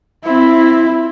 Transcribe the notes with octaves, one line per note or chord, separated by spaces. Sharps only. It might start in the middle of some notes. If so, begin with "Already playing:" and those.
C4 E4